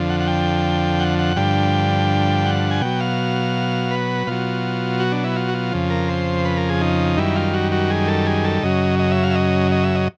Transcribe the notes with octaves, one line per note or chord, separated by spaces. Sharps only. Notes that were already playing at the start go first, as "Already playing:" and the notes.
Already playing: F2 D3 F3
F#5
F#5
G5
F#5
F#5
G2 D3 F3 G5
F#5
G#5
B2 F#3 G5
F5
B4
B2 F#3 F4
F#4
D4
E4
F4
F#4
F4
F2 C#3 F3
A#4
C5
B4
A#4
G#4
D#4
F#2 D#3 G3 E4
F4
F#4
F#4
G#4
A4
G#4
A4
F#2 C#3 F#3 D#5
D#5
E5
F5
E5
D#5
D#5
E5
D#5